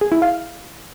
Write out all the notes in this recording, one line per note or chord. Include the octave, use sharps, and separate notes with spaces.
G#4
E4
F5